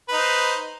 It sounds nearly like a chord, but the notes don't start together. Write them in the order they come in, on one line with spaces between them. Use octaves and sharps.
B4 D#4 C5